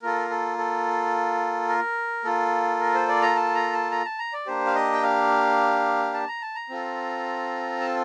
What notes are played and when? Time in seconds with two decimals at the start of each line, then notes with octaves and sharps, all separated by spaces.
0.02 A#3 F4 A4 A#4
0.30 A4
0.58 A4
1.69 A#4
2.24 A#3 F4 A4
2.80 A#4
2.94 C5
3.08 D5
3.22 A#5
3.36 A5
3.55 A#5
3.73 A5
3.91 A#5
4.05 A5
4.19 A#5
4.33 D5
4.46 A#3 D4 G4 C5
4.66 F5
4.75 D#5
4.93 G5
5.03 F5
6.14 A5
6.28 A#5
6.42 A5
6.55 A#5
6.69 C4 F4 A4
7.80 A5